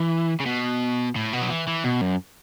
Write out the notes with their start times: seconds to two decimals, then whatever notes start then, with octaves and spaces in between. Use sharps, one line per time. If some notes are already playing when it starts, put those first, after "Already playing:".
Already playing: E3
0.40 C#3
0.46 B2
1.16 A2
1.33 B2
1.42 F#3
1.50 E3
1.67 E3
1.84 B2
2.01 F#2